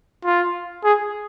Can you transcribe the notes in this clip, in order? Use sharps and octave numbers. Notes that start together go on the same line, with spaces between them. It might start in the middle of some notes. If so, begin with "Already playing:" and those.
F4
G#4